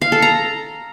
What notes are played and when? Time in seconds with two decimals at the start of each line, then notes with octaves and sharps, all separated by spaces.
0.02 F5
0.12 A4
0.22 A#5